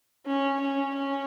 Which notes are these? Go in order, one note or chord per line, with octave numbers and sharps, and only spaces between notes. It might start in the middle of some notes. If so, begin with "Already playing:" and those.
C#4
C#4
C#4